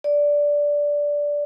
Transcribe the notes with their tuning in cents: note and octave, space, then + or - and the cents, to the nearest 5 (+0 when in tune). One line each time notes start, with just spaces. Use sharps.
D5 -10